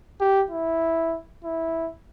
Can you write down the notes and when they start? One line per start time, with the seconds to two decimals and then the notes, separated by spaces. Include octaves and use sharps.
0.20 G4
0.51 E4
1.44 E4